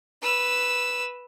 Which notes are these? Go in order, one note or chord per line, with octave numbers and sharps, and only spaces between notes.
B4 E6